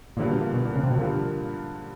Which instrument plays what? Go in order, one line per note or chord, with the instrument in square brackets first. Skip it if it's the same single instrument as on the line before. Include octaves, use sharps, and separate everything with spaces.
[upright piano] G2 D3 F3 A#3 [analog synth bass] A#2
[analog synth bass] B2
A#2
B2
A#2
C#3
C3
B2
[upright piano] G2 D3 F3 A#3 [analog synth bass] A#2